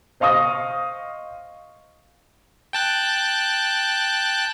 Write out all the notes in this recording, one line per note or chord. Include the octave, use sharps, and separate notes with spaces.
C5 D#5 F5 C#6 D#6 A#6
G5 A5 F#6